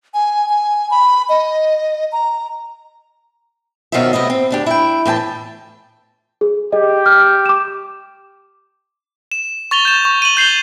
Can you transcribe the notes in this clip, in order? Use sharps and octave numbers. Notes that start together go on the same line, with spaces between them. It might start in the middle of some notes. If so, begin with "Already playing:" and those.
G#5
G#5
B5
D#5
A#5
B2 D#3 F#3 F4 C5 E5
A2 C3 B3 D#5
C4
D2 D4 G4
E4 G5
A2 E3 G5 A5
G#4
G4 G#4 D#5
F6
D6 E7
E7
C#6 A6 F7 G7
G6 E7
C#6
D#7 F#7
G6 C7 F7 G7